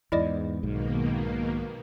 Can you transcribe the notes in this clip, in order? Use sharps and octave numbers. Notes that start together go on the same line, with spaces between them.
E2 G#2 E4 D5 D#5
B1 G#2 B2 D#3 A#3